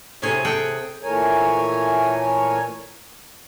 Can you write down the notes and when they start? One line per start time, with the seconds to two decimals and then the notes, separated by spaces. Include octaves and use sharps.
0.22 A2 C3 G#4 C#5 G#5
0.45 G#4 A4 F#5 G5
1.03 A#2 E3 A3 A#4 C#5 G#5